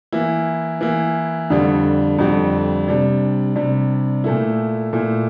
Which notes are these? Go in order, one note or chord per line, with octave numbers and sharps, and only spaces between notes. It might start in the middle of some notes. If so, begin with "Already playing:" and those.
E3 A#3 E4
E3 A#3 E4
F2 D3 G3 D4
F2 D3 G3 D4
C3 G3 D4
C3 G3 D4
A#2 A3 E4
A#2 A3 E4